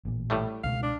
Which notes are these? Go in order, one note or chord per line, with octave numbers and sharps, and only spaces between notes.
A1 A#2
A2 G3 A3
C#2 B2 G#3 F5
D4